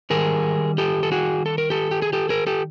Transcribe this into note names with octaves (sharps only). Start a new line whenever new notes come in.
D#3 G3 G#4 A#4
G4 A4
A4
F#4 G#4
A4
A#4
G4 A4
G4
G#4
G4 A4
G#4 A#4
G4 A4